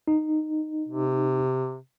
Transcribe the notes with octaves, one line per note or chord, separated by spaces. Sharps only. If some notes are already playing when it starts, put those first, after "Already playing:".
D#4
C3